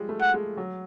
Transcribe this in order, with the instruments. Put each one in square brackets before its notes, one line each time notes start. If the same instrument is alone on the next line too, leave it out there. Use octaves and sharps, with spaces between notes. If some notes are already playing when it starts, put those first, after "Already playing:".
Already playing: [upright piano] F3 G3 G#3
A3
[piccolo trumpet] F#5
[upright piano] G#3
F#3